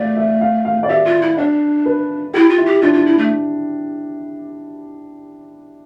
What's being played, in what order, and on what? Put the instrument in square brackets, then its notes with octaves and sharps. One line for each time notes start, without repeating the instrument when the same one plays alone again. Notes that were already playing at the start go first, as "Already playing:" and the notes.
Already playing: [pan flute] A3 [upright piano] D5 F5
[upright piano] E5
F5
F5
D5
[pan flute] G4 [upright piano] E5
[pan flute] F4
E4
[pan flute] D4 [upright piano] D5
[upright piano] B4
[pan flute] E4 [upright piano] G4
[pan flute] F4
[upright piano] E4
[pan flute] G4
[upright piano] D4 [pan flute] F4
[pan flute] F4
E4
A3